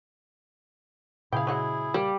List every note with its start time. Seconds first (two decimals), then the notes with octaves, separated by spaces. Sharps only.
1.32 A#2 C#3 E4 G#4 F5 G5
1.47 F#3 G#3 F#5
1.94 G3 A#3